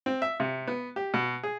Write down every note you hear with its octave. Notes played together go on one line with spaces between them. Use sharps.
C4
E5
C3
B3
G4
B2
G#4